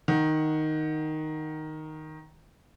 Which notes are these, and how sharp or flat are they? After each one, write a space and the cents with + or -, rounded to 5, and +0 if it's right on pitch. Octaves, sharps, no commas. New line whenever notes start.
D#3 +0 F#5 +0